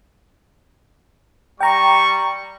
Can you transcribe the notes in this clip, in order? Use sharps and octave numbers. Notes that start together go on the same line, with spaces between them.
G3 G5 A#5 C#6